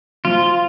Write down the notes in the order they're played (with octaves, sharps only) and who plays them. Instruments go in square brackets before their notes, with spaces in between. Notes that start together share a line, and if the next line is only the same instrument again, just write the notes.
[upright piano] F3 [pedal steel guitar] F4